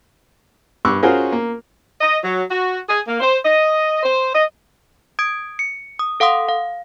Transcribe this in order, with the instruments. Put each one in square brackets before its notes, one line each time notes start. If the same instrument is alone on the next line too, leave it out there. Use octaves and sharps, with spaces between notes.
[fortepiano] G2 C#6 D6 E6 F#6
C#4 F4 F#4 G#4 A#4 C5
A#3
[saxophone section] D#5
F#3
F#4
G#4
A#3
C5
D#5
C5
D#5
[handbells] D#6 G#6 D7
C#7
D#6
A4 F5 F#5 C6 D#6
F5